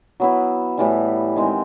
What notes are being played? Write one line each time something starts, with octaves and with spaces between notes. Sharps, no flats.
F#3 B3 E4
A2 E3 G3
D#3 G#3 C4